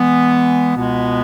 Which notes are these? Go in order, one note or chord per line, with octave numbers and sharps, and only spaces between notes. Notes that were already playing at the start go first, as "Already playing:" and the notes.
Already playing: E3 G#3 B3
C#2 B2 G#3 B3